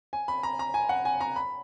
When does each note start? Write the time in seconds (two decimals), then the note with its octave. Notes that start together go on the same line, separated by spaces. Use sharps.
0.13 G#5
0.28 B5
0.43 A#5
0.59 A#5
0.74 G#5
0.89 F#5
1.05 G#5
1.21 A#5
1.36 B5